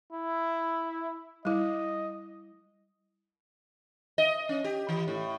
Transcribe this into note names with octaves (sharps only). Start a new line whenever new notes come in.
E4
G3 E4 D#5
D#5
C#4
G4
E3
A2